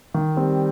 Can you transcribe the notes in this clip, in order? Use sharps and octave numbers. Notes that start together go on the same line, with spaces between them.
D#3
G3 C4